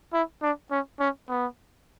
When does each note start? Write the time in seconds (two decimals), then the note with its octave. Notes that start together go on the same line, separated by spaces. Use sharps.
0.13 E4
0.43 D4
0.71 C#4
1.00 C#4
1.29 B3